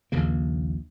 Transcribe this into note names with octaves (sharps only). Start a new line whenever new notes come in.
A#1 D#2 C#3 A#3